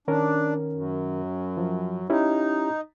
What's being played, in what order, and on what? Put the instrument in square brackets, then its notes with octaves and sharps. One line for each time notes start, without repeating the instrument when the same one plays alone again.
[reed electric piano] D#3 C#4 A#4 [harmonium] D4
[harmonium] F#2
[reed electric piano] F3
[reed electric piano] C#4 E4 G4 [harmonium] D#4